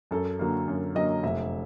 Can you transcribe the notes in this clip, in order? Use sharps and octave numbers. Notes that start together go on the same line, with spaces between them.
F#2 A4
D3 F#3 A#3
F#2
D3 F#3 A#3 D#5
F1 E5